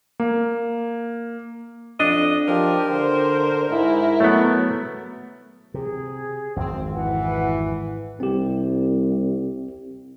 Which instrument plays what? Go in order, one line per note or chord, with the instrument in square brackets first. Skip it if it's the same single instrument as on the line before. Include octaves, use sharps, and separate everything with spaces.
[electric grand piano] A#3
[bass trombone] F2 [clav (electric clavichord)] D4 [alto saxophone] D#5
[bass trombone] F3 [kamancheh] G4 [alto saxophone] A#4
[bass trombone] D3 [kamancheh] C5
[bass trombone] G#2 [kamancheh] E4
[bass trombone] F#3 [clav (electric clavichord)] A3 B3
[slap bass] C3 [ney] G#4
[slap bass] G#1 F2 [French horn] C4
[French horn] E3 [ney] F#5
[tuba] C2 [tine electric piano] C4 G4